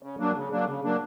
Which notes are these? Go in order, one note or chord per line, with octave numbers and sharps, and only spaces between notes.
C#3
F#3 A#3 D4
C#3
F#3 A#3 D4
C#3
F#3 A#3 D4